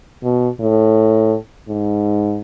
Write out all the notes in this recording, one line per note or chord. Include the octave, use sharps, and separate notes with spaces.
B2
A2
G#2